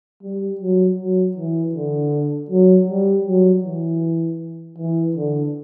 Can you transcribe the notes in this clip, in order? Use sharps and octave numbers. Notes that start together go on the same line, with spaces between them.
G3
F#3
F#3
E3
D3
F#3
G3
F#3
E3
E3
D3